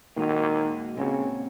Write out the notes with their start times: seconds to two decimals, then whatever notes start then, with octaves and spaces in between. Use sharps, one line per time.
0.16 A#2 D#3 G#3 D#4 F#4
0.97 A#2 C#3 G#3 C4 F#4